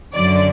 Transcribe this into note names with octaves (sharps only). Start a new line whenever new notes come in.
F#2 D3 F#3 D5